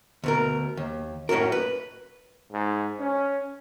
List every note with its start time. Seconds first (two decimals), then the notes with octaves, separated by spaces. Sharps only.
0.24 D2 B2 A#4
0.77 D#2
1.29 F#2 A2 C#4 F#4 A#4
1.52 B4
2.52 G#2
3.00 C#4